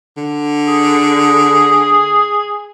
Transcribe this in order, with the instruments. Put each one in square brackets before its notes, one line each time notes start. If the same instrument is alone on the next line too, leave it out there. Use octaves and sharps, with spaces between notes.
[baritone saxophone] D3
[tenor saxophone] G#4